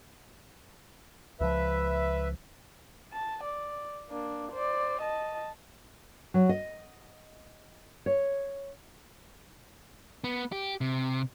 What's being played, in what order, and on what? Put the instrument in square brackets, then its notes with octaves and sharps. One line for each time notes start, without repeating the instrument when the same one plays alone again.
[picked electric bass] C#2 F3 [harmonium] B4 E5
[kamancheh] A5
D5
A#3 D4
C5 D5
D#5 A5
[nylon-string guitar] F#3
D#5
C#5
[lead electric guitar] B3
G4
C3